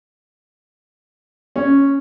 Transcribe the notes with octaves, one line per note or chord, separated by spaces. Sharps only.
C#4